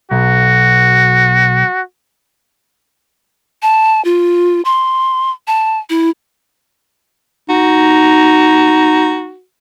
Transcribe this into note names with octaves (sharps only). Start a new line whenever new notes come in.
B1 F#4
A5
F4
C6
A5
E4
D#4 F#4